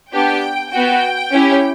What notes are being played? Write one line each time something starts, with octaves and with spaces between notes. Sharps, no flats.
B3 D4 G4 G5
B3 F#4 G5
C#4 E4 G4